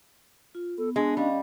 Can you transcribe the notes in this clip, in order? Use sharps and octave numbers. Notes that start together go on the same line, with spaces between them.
F4
B3 A4
G#3 D4
G3 C#4 D#5 F5